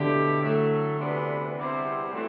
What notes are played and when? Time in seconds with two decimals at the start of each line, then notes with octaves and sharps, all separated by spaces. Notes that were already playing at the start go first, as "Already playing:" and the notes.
Already playing: B2 D3 A3 E4 G4
0.41 A2 F#3 A3
0.99 D2 C3 E3 B3 D4
1.55 E2 C3 G3 C4 E4
2.12 A2 E3 A3 C4 F#4